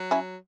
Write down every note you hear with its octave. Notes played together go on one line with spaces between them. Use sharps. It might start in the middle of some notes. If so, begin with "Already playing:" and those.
Already playing: F#3
C#4 E4